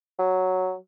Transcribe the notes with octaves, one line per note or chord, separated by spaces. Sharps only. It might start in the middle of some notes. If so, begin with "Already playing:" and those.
F#3